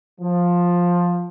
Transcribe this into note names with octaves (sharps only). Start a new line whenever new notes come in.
F3